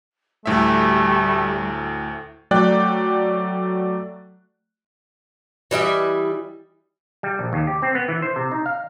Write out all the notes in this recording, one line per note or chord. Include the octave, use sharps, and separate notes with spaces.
D2 A2 G3 A3 E5
F#3 A3 D5 G5 F#6
E3 G3 D#5 E5
G3
A#1
D#2
G4
C4
B3
E3
C5
C3
D#4
F5